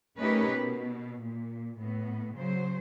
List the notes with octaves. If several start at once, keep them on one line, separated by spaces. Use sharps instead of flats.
A3 C#4 D#4 G4 A#4 B4
B2
A#2
A2 B3
C#3 F#3 C5